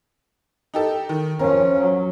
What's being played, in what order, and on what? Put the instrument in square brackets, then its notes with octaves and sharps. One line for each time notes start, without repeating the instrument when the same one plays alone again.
[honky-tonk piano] D#4 G4 A4
D#3
[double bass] F3 C#4 [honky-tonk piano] A#4
[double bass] F#3